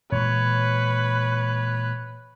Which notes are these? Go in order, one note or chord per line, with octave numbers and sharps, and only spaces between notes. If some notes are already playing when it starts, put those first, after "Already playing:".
A#2 E3 G#3 B4 C#5